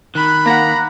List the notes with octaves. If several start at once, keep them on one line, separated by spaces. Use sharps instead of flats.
D#3 B5 F#6
A#3 F#5 A#5